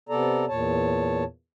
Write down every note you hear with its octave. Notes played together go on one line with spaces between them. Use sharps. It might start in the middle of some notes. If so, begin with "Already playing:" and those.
C3 B3 A4 D5 A#5
E2 A#2 C#5 A5